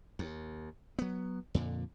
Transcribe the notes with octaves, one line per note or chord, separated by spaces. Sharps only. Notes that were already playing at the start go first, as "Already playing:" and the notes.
D#2
F#3 B3
F2 A#2 D3